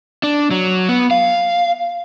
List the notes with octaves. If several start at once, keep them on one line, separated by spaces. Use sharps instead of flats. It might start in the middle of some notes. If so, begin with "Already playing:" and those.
D4
F#3
B3
F5